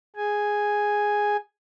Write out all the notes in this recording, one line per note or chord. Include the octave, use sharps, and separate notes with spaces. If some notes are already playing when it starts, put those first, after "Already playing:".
G#4 G#5